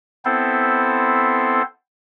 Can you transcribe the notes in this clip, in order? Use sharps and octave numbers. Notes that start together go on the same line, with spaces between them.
B3 C4 E4 A4 C5